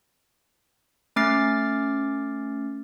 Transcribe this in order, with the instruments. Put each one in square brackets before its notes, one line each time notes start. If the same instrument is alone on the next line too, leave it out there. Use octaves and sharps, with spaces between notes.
[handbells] A3 C#4 D6 F6 A6 C7